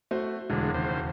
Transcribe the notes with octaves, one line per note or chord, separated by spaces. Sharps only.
A3 F#4 C5
E1 D3 G#3
D#2 C#3 C5